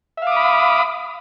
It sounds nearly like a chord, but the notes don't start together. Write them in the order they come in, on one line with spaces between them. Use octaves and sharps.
E5 F5 D6 D#6 B5